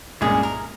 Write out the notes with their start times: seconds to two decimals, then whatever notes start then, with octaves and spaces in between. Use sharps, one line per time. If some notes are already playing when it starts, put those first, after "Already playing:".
0.21 C2 A#2 G#3 C#4 G#4
0.43 A#4